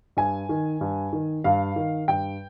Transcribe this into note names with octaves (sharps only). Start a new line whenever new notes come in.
G2 G#5
D#3
G2
D#3
G2 F5
D#3
G2 G5